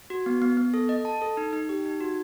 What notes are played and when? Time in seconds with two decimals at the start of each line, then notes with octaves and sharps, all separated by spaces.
0.10 F#4
0.26 B3
0.42 B3
0.57 B3
0.74 A4
0.89 D#5
1.05 A5
1.22 A4
1.37 D#4
1.53 D#4
1.69 G4
1.86 D#4
2.00 F#4